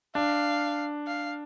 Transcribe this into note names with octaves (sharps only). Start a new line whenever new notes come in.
D4 F5
F5